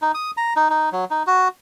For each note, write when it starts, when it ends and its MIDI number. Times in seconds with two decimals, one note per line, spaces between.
0.02 0.12 63
0.14 0.31 87
0.37 0.54 82
0.56 0.68 63
0.70 0.89 63
0.92 1.05 54
1.11 1.23 63
1.27 1.48 66